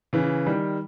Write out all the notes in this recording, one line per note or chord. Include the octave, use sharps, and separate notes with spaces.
C#3 E3
D#3 G3